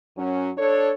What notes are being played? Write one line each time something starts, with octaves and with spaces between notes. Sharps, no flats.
F#2 F#3 C#4
D4 A4 C#5